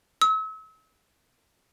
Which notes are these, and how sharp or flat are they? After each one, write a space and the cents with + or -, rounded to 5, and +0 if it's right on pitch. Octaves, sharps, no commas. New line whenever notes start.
E6 -40